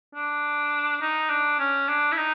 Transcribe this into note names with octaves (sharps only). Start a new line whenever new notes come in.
D4
D#4
D4
C#4
D4
E4
D#4